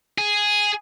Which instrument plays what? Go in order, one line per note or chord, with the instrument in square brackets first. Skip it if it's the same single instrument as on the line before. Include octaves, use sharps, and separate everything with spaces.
[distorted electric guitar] G#4